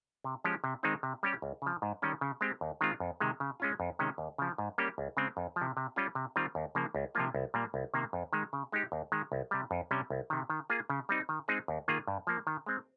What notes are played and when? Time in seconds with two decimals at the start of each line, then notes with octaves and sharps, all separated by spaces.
0.24 C3
0.44 F3 G#3 C#4 G4
0.64 C3
0.83 D#3 G#3 C4 D#4
1.03 C3
1.23 G3 C#4 G4
1.42 C#2
1.62 C#3 F3
1.82 G#2
2.02 D#3 G3 C#4
2.21 C#3
2.41 G#3 C4 G4
2.61 D#2
2.81 D#3 G#3 C4 F4
3.00 F2
3.20 C3 D#3 G#3
3.40 C#3
3.60 G#3 C#4 F4
3.80 F2
3.99 C3 D#3 G#3 C#4
4.18 D#2
4.38 C#3 F3
4.58 G#2
4.78 G3 A#3 C#4 G4
4.98 C#2
5.17 C#3 G#3 C4
5.37 F2
5.56 F3
5.62 C3
5.77 C3
5.96 G3 C#4 F4
6.15 C3
6.36 D#3 G3 C4 F4
6.55 D#2
6.75 C#3 F3 A#3
6.95 C#2
7.15 C3 F3 A#3 F4
7.35 C2
7.54 A#2 G3 A#3
7.74 C2
7.94 C3 D#3 A#3
8.13 F2
8.33 D#3 G#3
8.53 C#3
8.72 G#3 D#4 G4
8.92 D#2
9.12 D#3 G#3
9.32 C2
9.51 C3 G3
9.71 F2
9.91 C3 G3 C#4
10.10 C2
10.30 C3 D#3
10.50 D#3
10.70 A#3 F4 G#4
10.90 C#3
11.09 G3 C4 D#4
11.29 D#3
11.48 G#3 C4 D#4 G#4
11.68 D#2
11.88 D#3 A#3 F4 G#4
12.08 G2
12.27 F3 A#3
12.47 D#3
12.66 G#3 C4